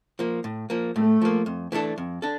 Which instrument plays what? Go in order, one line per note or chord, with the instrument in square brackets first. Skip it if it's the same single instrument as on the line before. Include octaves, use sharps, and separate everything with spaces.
[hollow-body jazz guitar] F3 A#3
A2
F3 A#3
[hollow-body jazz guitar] A2 [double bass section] A3
[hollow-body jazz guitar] F3 A#3
F2
E3 A3 D4 A4
F2
D4 A4